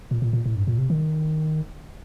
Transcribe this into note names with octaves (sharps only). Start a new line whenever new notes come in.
A#2
A#2
A#2
A2
G2
A#2
C3
D#3